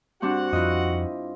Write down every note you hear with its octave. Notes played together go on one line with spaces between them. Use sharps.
G2 C4 D4 F#4 F#5
F2 E4 F4 D#5